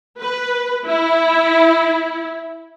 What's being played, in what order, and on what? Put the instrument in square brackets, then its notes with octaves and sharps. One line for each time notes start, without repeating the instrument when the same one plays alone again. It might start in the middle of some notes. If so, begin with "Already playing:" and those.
[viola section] B4
E4